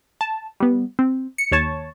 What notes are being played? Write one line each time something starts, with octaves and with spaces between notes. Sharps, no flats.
A5
G3 B3
C4
C#7
D#2 C#5 A5 C#6